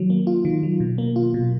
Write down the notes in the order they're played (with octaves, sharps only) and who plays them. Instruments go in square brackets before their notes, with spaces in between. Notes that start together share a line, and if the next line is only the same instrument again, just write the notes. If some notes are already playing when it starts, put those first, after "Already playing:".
Already playing: [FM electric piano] D#3 F#3
A#3
F4
D#3
F#3
B2
A#3
F4
B2